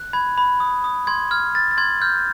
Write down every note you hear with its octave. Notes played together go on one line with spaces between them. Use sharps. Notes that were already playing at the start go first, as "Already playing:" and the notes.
Already playing: F#6
B5 G#6
B5
D#6
D#6
C6 G#6
F6 G#6
F6 A6
A6
C6 G#6
F6 G6